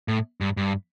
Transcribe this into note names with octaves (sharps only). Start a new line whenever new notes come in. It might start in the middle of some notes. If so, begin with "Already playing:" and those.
A2
G2
G2